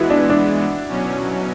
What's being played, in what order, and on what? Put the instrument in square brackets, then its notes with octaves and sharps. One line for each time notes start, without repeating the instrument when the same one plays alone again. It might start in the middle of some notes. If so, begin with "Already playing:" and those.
Already playing: [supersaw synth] E3 G#3 B3 [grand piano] E4 F#4
[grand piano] D4
D4
[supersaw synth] B2 F#3 C#4